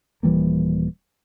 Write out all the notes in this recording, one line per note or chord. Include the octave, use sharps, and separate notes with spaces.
D#1 E3 G3 A#3